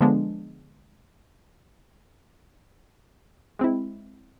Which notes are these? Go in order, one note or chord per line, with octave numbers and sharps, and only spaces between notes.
D3 F3 G#3 B3 D4
G#3 C4 E4